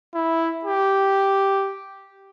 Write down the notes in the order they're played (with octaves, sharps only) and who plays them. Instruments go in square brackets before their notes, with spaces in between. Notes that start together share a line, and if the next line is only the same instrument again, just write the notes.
[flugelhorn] E4
G4